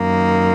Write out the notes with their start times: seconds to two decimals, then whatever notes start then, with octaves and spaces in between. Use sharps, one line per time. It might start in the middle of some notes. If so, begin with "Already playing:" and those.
Already playing: F#2 D#3 A#3